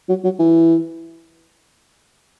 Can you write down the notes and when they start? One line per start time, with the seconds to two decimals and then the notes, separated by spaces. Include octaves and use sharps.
0.09 F#3
0.24 F#3
0.39 E3